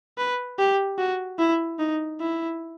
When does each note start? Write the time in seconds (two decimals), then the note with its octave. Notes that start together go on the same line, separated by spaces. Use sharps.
0.18 B4
0.59 G4
0.98 F#4
1.39 E4
1.79 D#4
2.21 E4